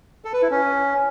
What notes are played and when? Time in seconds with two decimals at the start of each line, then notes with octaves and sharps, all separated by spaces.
0.25 A4
0.33 B4
0.42 E4
0.51 C#4